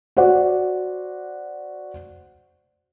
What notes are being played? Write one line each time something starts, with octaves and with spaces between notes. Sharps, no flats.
F#4 C5 D5 F#5